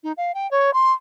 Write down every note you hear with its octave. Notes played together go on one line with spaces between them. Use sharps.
D#4
F5
G5
C#5
C6